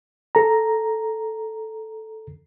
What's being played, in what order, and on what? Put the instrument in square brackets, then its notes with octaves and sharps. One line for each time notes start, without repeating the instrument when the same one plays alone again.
[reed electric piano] A4 A#5